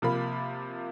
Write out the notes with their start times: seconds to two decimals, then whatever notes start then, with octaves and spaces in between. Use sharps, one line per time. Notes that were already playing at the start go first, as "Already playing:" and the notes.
0.02 C3 F3 A#3 B5